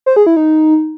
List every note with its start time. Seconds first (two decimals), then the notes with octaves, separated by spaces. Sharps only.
0.06 C5
0.16 G#4
0.26 E4
0.37 D#4